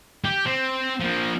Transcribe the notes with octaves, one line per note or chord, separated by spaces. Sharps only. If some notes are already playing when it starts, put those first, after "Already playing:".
G4
C4
F3 A#3